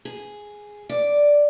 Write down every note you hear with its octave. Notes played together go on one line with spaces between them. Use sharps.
G#4
D5